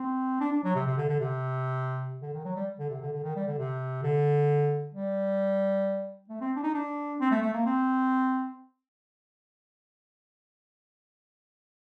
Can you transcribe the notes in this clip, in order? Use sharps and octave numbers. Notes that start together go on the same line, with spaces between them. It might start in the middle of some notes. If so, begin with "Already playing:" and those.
Already playing: C4
D4
D4
F#3
C3
C3
D3
D3
C3
D3
D#3
F#3
G3
D3
C3
D3
D3
D#3
G3
D3
C3
D3
G3
A3
C4
D4
D#4
D4
C4
A3
A3
A#3
C4